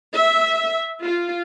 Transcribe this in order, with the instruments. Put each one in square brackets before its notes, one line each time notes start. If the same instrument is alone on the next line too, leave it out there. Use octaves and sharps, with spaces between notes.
[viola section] E5
F4